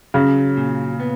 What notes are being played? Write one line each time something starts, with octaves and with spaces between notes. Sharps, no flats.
C#3 F#3
A#2
B3